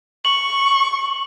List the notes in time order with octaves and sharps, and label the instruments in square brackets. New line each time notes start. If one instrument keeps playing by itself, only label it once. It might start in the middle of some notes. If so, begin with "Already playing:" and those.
[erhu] C#6 [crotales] F#7